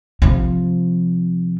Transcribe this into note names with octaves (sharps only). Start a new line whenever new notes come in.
C3 F3